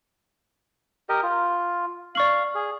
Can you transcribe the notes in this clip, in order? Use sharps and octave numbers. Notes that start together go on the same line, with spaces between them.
G4 A#4 D#5
F4
D5 F5 C#6 F#7
G#4